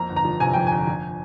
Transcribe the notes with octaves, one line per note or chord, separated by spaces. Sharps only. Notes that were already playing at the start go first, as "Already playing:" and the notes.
Already playing: F2 A#3 A#5
G1
A#5
F3
C3 G#5
F2 G5
G1 G#5
F3